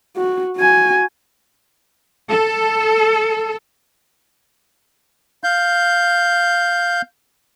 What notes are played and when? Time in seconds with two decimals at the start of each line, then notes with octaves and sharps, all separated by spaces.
0.16 F#4
0.57 F#4 G#5
2.29 A4
5.44 F5 G6